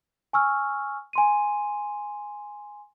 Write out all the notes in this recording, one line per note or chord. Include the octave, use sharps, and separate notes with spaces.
G#5 C#6 E6 F6
G#5 C6 D#7